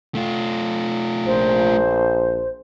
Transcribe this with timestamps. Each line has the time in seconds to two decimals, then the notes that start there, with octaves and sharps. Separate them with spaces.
0.15 A3 F4
1.26 A#1 C5